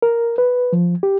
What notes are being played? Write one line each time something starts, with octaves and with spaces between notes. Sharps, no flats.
A#4
B4
F3
G4